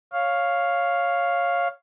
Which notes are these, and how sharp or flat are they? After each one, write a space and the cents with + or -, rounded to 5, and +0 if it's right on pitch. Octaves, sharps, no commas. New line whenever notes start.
C#5 +0 F5 +0